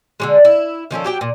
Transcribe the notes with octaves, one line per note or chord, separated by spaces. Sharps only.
D3 G3 G#3
E4
D#3 F3 C#4 A4
F#3 G4 G5
A#2